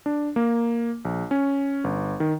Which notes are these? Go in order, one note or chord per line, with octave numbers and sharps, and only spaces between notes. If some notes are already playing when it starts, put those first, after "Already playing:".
D4
A#3
A#1
C#4
G1
D#3